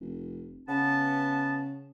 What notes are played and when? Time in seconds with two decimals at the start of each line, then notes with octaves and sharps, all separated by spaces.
0.01 F1
0.68 C#3 B3 A5